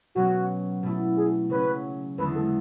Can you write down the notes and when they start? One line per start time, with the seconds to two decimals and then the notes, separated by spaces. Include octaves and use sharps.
0.15 B2 F#3 C#4 F#4
0.83 B2 A3 E4
1.17 G#4
1.49 C#3 F#3 C#4 B4
2.18 E2 D3 G#3 D4 B4
2.35 A4